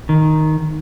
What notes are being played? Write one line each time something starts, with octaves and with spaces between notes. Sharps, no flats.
D#3